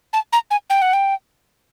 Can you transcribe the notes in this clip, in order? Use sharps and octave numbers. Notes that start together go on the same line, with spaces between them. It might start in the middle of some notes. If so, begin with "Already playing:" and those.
A5
A#5
G#5
G5
F#5
G5